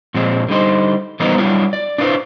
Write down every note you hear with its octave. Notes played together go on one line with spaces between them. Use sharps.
A#2 F3 G#3 C4
D3 G3 D#4 C5
E3 G3 B3 D#4 A#4 C5
F#3 G3 D4 E4 F4
D5
D4 E4 F4 B4 C5